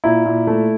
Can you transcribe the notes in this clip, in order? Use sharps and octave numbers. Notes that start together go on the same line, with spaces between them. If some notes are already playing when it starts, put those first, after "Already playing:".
A#2 E4
A#2
A3